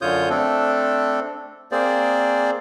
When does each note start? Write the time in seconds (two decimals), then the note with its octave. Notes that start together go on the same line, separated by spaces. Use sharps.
0.02 F#2 D3 F4 C#5 D#6 G6
0.30 A3 C4 D4 A4
1.72 A#3 C4 G#4 C5 D5